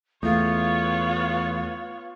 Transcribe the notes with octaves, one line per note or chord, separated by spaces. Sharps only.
E2 A3 B3 F4 C#5